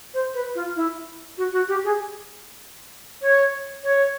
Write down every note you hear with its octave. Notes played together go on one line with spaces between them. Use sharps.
C5
B4
F4
E4
F#4
F#4
G4
G#4
C#5
C#5